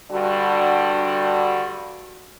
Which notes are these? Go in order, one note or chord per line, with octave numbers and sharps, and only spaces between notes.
G2 D3 G3 F#4